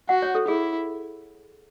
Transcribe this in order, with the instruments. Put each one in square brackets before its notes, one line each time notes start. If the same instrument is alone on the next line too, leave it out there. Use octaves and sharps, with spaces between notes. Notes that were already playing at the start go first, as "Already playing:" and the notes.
[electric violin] F#4 [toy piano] F#5
[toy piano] C#5
A4
[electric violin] E4 [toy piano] G#4